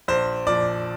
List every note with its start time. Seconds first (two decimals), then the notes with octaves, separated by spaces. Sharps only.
0.08 A#1 C5
0.47 A#2 F3 D5